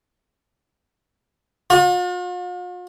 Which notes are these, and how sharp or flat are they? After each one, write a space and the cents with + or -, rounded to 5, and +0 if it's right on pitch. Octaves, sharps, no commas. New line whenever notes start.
F4 +45